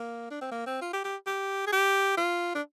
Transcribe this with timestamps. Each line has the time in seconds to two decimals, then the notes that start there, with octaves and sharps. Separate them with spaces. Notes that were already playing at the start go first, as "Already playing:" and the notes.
Already playing: A#3
0.31 D4
0.41 C4
0.51 A#3
0.66 C4
0.81 F4
0.93 G4
1.04 G4
1.27 G4
1.67 G#4
1.72 G4
2.17 F4
2.55 D4